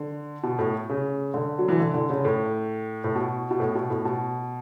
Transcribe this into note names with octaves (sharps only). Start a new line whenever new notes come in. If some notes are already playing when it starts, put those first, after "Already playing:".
Already playing: D3
B2
A2
C#3
D3
F#3
E3
D3
D3
C#3
A2
A2
B2
B2
A2
B2
A2
B2